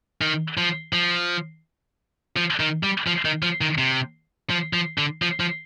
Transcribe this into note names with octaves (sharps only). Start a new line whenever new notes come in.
D#3
F3
F3
F3
D#3
G3
F3
D#3
F3
D#3
C3
F3
F3
D3
F3
F3